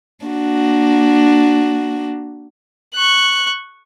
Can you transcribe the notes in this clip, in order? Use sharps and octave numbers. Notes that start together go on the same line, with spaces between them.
A#3 D4 F#4
C#6 F#6